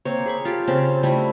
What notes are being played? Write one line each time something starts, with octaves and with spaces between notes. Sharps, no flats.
A#3 C4 C#5
G#4 B5 C#6
F4 G4 A4
C#3 C4 C#4 A5
G3 A3 C4 E4